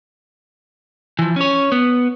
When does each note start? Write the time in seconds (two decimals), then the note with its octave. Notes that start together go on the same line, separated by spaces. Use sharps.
1.19 E3 F3
1.36 C#4 C#5
1.72 B3